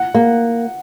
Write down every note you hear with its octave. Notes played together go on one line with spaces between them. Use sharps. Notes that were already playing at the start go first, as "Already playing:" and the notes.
Already playing: F#5
A#3